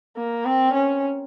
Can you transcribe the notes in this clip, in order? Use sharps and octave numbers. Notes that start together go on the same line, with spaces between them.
A#3
C4
C#4